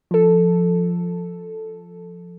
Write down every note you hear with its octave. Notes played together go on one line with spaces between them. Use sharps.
F3 A4